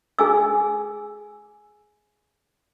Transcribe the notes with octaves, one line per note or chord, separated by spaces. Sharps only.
G#4 G#5 E6